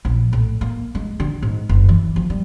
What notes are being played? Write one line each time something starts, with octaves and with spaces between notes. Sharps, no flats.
A#1
A2
A#3
G#3
D3
G#2
F#1
E3
F3
G3